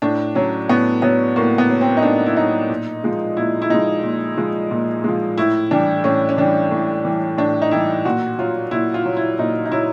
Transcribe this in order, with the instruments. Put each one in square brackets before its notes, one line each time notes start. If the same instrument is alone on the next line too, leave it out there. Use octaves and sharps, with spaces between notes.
[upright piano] A2 D4
F#3 C#4
A2 B3
F#3 B3
A2 A#3
B3
F#3
C4
D#4
A2 D4
E4
F#3 D#4
A#2
F3 G#3
A#2 E4
E4
F3 G#3 D#4
A#2
F3 G#3
A#2
F3 G#3
A2 E4
E3 G3 D4
A2 C#4
C#4
E3 G3 D4
A2
E3 G3
A2 D4
D#4
E3 G3 E4
A#2 F#4
F#3 F4
A#2 E4
F4
F#3
E4
A#2 D#4
D#4
F#3 E4